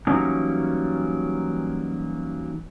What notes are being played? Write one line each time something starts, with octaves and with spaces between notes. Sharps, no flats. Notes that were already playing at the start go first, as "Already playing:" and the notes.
E3 F#3 G3 A#3 C#4 D#4